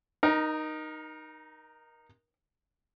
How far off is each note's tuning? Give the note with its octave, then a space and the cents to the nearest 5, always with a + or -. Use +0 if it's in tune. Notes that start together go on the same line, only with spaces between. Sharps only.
D#4 -10 A#4 +25